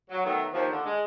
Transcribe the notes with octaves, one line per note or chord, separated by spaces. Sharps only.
F#3
D#3 F#3 A3 B3
D#2 F3
D3
G#3